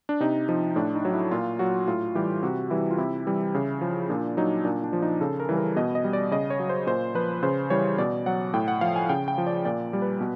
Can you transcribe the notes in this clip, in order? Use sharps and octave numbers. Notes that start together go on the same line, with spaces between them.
D4
C3 D#4
F3 D#4
A2 D4
D#4
F#3
E4
A#2 F4
F#3 F#4
A2 F4
E3 G3 G4
C3 F#4
E3 G3 E4
F4
C3 E4
E3 G3
C#3
F3
A#2 D4
F#3 D#4
A#2 D4
D4
F3
D#4
C#3 A4
A#4
E3 G3
A#4
B2 D#5
D#5
G3
D5
C#3 D#5
C#5
F#3
C5
A#2 C5
F3 B4
C#3 C5
E3 G3 C#5
B2 D5
F#3 F#5
A2 G5
F#5
F3 F5
G#5
C#3 G5
G5
F3
D5
A#2 D5
G3
B4
B2